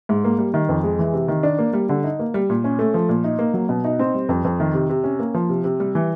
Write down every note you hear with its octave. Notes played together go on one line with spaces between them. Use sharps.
G#2
A#3
G3
D#3
F2
G#3
E3
C3
D#3
D4
A#3
G3
D3
D#4
A#3
G3
A#2
C#4
A3
F3
A#2
D#4
A#3
F#3
B2
D#4
C4
G3
F2
F2
D#3
C3
C3
C#4
A#3
F3
C3
C3
G3
E3